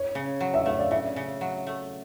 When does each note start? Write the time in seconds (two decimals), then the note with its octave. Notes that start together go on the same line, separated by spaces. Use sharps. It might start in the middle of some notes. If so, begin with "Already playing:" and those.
Already playing: C#5
0.15 C#3
0.41 F#3
0.54 E5
0.66 A3 F5
0.79 D5
0.91 C#3 E5
1.16 C#3
1.41 F#3
1.67 A3